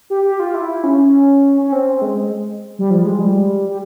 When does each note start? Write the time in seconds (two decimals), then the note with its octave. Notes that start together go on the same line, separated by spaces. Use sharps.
0.10 G4
0.25 G4
0.40 F4
0.54 E4
0.84 C#4
1.62 C#4
1.72 C4
2.02 G#3
2.79 G3
2.90 F3
3.05 G#3
3.20 G3
3.69 G3